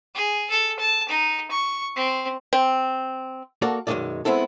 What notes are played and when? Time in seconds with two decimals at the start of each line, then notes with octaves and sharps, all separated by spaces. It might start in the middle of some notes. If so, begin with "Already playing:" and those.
0.15 G#4
0.50 A4
0.79 A5
1.09 D#4
1.51 C#6
1.96 C4
2.53 C4
3.62 A#3 F#4 A4 A#4 D5
3.87 B1 F#2 A#2 D#3 G#3 D5
4.25 G#3 B3 C4 E4 A4